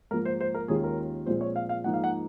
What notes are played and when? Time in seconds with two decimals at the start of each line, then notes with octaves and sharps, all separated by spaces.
0.11 G#2 A#4
0.13 F3 A#3
0.25 C5
0.41 C5
0.54 A#4
0.68 D#2 D#3 G#3 C#4 F4 G#4
0.84 A#4
1.26 A#2 F3 G#3 C4 F4 C5
1.41 C#5
1.56 F5
1.69 F5
1.84 G#2 F3 A#3 D#4 F#5
1.94 F5
2.04 F#5